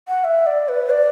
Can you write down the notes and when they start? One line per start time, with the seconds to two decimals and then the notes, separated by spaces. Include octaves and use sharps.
0.08 F#5
0.24 E5
0.46 D5
0.69 B4
0.90 D5